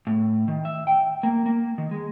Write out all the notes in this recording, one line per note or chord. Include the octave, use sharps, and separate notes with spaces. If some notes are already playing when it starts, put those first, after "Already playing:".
A2
D#3
E5
G5
A#3
A#3
D#3
G#3